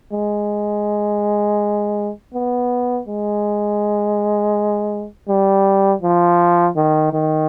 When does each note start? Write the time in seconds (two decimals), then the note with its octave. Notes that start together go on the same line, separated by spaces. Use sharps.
0.13 G#3
2.34 B3
3.08 G#3
5.28 G3
6.02 F3
6.76 D#3
7.13 D#3